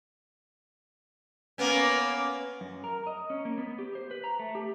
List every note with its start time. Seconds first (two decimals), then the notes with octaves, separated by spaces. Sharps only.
1.58 A#3 B3 C#4
2.61 F#2
2.84 A#4
3.07 D#5
3.30 C#4
3.45 A#3
3.58 B3
3.79 G4
3.95 C5
4.11 B4
4.24 A#5
4.39 A3
4.55 G4